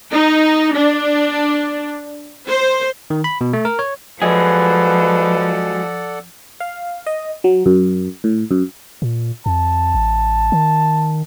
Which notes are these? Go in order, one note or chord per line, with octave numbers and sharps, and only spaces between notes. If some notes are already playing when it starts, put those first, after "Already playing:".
D#4
D4
C5
D#3
B5
B2
A3
A#4
C#5
F3 F#3 G#3 G#4 A4 B4 D5 F#5
F5
D#5
F#3
F#2
A2
F#2
A#2
F2 A5
A1
D#3